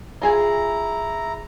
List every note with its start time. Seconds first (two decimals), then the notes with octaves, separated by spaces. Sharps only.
0.22 E4 F4 G#4 G#5 A#5